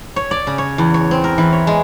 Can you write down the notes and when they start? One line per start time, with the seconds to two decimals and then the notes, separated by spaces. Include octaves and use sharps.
0.16 C#5
0.31 D5
0.47 C#3
0.58 C#5
0.78 E2
0.94 C#5
1.11 C4
1.24 A#4
1.38 E3
1.53 C#5
1.67 G#3